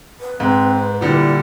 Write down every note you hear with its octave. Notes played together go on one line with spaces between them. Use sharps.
B4
G#2 C4
A#2 D3 G3 E4